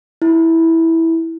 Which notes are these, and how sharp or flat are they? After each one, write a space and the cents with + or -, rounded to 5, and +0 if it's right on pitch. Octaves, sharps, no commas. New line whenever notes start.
E4 -10